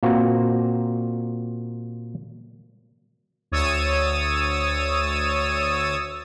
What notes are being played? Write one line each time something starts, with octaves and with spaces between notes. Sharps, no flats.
A#2 A#3 C4 F#4
D2 C#5 D#6 E6 A6 D#7